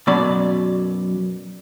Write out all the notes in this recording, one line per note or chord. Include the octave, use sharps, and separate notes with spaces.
F#2 B2 F#3 D5 B5